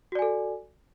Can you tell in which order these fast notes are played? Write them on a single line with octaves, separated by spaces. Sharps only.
F#4 D5 G#5 A4